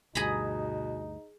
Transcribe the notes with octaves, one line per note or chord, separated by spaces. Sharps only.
D2 G2 B2 D#4 G#4 A#5 B5